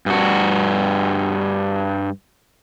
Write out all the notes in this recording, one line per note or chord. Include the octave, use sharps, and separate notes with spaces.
G2 F#4